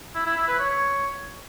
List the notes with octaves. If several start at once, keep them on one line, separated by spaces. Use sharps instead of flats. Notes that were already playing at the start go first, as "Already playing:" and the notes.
E4
E4
E4
B4
C#5